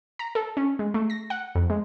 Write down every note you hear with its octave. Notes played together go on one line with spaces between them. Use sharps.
A#5
A4
C#4
G#3
A3
A#6
F#5
F2
G#3